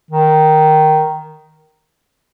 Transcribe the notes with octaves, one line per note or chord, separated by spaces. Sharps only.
D#3